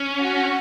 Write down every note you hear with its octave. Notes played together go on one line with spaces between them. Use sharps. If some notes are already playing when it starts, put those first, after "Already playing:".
Already playing: C#4
F#4